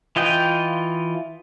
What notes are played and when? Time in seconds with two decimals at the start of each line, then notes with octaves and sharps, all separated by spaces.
0.16 E3 F4 D#5 G5